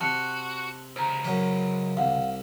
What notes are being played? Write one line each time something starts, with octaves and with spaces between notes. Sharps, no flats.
C3 F#4 A5 F#6 C#7
C#2 C5 A#5
F#2 C#4
C2 F5 F#5